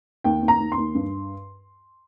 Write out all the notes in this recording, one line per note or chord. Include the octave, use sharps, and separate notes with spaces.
D#2 G5
D#2
A#5
D#2
C6
D#2
G2